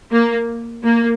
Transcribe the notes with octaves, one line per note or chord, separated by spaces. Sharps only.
A#3
A#3